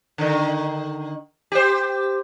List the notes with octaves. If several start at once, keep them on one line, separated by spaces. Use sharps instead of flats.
D3 D#3
G4 C5